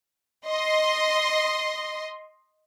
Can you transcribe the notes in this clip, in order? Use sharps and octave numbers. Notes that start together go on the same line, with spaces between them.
D#5 C6